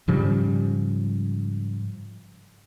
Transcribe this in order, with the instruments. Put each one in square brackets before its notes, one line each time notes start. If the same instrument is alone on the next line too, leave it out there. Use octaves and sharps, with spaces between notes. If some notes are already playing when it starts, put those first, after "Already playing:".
[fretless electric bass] G#2 C#3 F3 G3